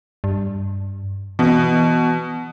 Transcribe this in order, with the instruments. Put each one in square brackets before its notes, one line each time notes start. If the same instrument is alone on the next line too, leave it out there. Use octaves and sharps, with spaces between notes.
[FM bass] G2
[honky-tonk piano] B2 [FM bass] E3